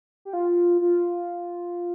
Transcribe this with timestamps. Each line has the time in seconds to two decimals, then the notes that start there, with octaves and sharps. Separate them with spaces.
0.25 G4
0.33 F4
0.81 F4